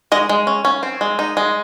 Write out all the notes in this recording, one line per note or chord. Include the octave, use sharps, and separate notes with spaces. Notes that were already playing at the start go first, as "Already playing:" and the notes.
G#3 D#5
G#3
C#4
C#4
C4
G#3
D#4
G#3